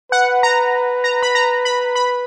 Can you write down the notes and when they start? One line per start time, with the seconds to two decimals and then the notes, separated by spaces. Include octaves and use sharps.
0.11 B4 F#5
0.43 A#5
1.04 A#5
1.23 B5
1.35 A#5
1.65 B5
1.96 B5